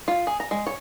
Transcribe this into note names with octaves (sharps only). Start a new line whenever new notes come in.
F4
G#4
A#5
G#3
C#5